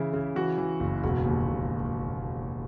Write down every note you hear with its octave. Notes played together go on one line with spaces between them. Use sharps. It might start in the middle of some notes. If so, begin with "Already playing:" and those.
Already playing: C#3 E3 E4
C#3
E3 F#4
E3
F#1
E1 F#4
D#2
E1